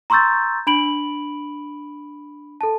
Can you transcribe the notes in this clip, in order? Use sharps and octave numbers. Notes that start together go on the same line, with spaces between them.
A#5 C6 C#6 E6 G6 A6
D4 B5 D7 F#7
A4 A5